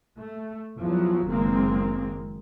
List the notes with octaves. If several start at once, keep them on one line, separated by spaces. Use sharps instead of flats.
A3
E2 F3 F#3
F#1 D#3 G#3 A#3 C4